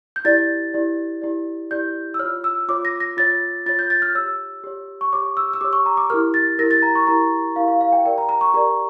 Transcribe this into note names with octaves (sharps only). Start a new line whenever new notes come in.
G6
E4 G4 D5 A6
E4 G4 D5
E4 G4 D5
E4 G4 D5 G6
E6
F4 C#5 F6
E6
F4 C#5 D6
A#6
A#6
F4 C#5 A6
F4 C#5 A6
G6
A6
F6
G4 C#5 E6
G4 C#5
C#6
G4 C#5 D6
E6
E6
G4 C#5 D6
C#6
A#5
D6
E4 G4 A#4 F6
A6
E4 G4 A#4 A#6
A6
A#5
C#6
E4 G4 A#4 A#5
E4 G4 A#4 F5
F5
F5
G5
G4 A#4 D5 G5
A#5
A#5
C#6
G4 A#4 D5 A#5